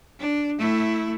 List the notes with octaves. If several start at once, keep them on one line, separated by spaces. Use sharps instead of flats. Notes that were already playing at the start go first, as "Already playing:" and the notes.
D4
A3 E4